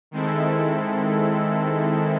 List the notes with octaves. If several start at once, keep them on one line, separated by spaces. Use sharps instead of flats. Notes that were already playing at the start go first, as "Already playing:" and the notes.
D#3 G#3 C4 E4 A4